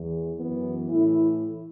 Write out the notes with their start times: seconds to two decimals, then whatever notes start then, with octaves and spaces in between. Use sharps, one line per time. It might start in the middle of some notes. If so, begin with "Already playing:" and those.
Already playing: E2 E3
0.35 F#2 E3 B3
0.90 A2 E3 E4